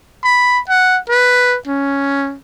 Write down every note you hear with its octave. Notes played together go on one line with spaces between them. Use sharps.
B5
F#5
B4
C#4